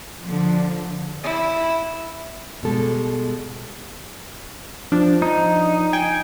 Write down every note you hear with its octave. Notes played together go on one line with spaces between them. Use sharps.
D3 F3
E4
B2 G3 G#3 A4
F3 D4
D#4
G5 G#5